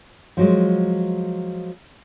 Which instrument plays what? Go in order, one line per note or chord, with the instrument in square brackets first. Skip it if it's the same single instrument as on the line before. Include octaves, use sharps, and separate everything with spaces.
[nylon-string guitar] F3 F#3 G#3